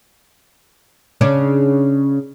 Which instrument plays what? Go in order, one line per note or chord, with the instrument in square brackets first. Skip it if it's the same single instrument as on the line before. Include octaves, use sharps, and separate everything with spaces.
[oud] C#3 C#4 D4